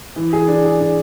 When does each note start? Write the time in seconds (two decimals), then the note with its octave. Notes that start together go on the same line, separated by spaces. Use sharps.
0.16 E3
0.33 G#4
0.48 D4
0.65 G#4
0.80 D4